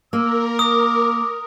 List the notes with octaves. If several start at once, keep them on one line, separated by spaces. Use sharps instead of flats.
A#3 A#4 E6
D6 D#6